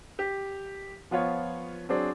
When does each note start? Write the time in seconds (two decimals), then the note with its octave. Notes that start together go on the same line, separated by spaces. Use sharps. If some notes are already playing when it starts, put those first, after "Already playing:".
0.19 G4
1.11 F3 B3 F4 C#5
1.89 F#3 C4 D4 G#4